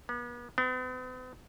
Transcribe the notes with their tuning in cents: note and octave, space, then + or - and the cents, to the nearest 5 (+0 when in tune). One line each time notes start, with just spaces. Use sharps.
B3 -40
B3 +45